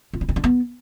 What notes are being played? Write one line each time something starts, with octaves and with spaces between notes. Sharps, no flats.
F4
E4
D#4
D4
B3